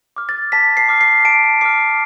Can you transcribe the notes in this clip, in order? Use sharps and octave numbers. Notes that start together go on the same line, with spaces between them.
D6 F6
A6
A5 B6
C7
D6 F6
C7
A5 D7
D6 F6 C7